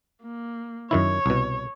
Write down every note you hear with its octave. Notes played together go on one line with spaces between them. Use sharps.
A#3
F#2 D#3 E4 C#5
C2 B2